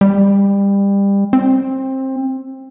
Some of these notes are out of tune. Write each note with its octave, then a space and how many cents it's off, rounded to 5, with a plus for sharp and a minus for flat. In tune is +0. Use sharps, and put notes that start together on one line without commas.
G3 +25
C4 +20